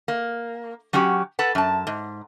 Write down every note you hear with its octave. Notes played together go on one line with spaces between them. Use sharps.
A#3
F#3 C#4 F#4 G4
A4 B4 F#5
F#2 A5
G#2